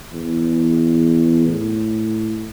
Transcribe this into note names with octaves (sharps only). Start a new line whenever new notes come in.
E2
A2